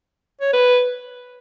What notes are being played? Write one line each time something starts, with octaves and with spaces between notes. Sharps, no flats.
C#5
B4